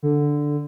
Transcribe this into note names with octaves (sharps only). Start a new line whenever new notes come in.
D3